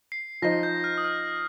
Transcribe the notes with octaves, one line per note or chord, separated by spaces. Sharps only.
C7
F3 D#4 C5 D#5 A#6
G6
F6
D#6
F6